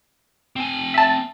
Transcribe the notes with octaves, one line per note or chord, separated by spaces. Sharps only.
C4 G#5
E5 A5